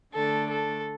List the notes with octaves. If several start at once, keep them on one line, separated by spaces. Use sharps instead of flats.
D3 A3 D4 A4
A4